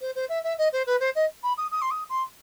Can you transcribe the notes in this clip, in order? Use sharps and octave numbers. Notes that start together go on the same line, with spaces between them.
C5
C5
E5
E5
D#5
C5
B4
C5
D#5
B5
D#6
D#6
C6
D#6
C6